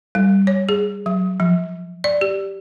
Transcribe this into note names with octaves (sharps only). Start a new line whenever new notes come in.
G3
C#5
G#4
F#3
F3
D5
G4